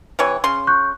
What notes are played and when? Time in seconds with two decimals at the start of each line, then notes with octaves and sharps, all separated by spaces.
0.19 C3 E3 C#5
0.44 C#3 C#4 C6
0.67 C#6 F#6 G6